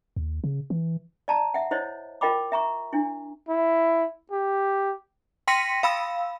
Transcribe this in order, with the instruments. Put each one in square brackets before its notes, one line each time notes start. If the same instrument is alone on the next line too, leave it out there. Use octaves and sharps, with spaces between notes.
[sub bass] D#2
C#3
E3
[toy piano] D5 A5 A#5
E5 F#5
E4 C5 C#5 D#5
F4 A#4 D#5 G5 B5 D6
E5 A#5 C#6
D4 E4
[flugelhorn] E4
G4
[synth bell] G5 C6 A#6 B6 C#7 D#7
F5 B5 E6